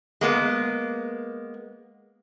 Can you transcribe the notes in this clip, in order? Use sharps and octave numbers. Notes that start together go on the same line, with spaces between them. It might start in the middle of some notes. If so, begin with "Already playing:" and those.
G#3 A#3 B3